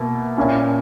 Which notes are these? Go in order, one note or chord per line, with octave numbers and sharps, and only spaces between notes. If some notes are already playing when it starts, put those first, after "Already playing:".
Already playing: B2 A#3 E4
A#2 A#3 C#4 E4